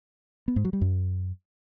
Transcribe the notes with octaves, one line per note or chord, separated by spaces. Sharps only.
B3
G#2
F#3
G3
F#2